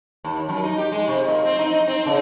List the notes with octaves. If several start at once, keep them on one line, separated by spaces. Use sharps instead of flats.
D#2
F#2
D#4
G4
G#3
C3
A#2
C4
D#4
D#4
C4
C#3